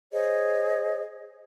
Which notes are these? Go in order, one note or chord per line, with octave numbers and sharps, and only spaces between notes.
G#4 C5 C#5 D#5